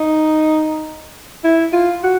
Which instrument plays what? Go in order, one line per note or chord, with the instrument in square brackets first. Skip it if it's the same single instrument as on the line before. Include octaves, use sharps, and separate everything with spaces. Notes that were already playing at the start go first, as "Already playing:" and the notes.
Already playing: [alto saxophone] D#4
E4
F4
F#4